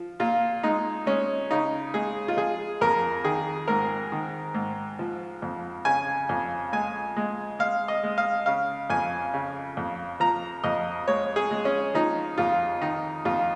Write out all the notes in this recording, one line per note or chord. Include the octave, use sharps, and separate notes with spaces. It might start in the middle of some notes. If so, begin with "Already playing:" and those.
Already playing: F3
A#2 F4
G#3 D#4
G#3 C#4
C#3 D#4
G#3 G#4
F4
F3 G#4
F2 A#4
D#3 G#4
G#2 A#4
D#3
G#2
F3
F2
C#3 G#5
F2
G#3 G#5
G#3
G#3 F5
D#5
G#3
F5
C#3 F5
F2 G#5
C#3
F2
F3 A#5
F2 D#5
G#3 C#5
G#4
G#3
C#4
F3 D#4
F2 F4
D#3 D#4
F2 F4